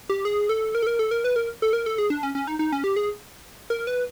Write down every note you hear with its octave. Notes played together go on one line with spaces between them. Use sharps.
G4
G#4
A4
A#4
A4
A#4
A4
A#4
B4
A#4
A4
A#4
A4
G#4
D4
C#4
C#4
D#4
D#4
C#4
G4
G#4
A#4
B4